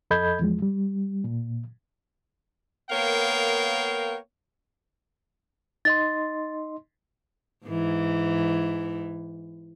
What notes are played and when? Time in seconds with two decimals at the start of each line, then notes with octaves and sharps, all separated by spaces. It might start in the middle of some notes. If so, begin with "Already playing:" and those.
0.11 F2 A4 D#5 B5 G6 G#6
0.39 E2 F3 G#3
0.62 G3
1.24 A#2
2.91 A#3 B3 A#4 C#5 F5 G5
5.85 D#4 D#5 C6 A6
7.67 G#2 E3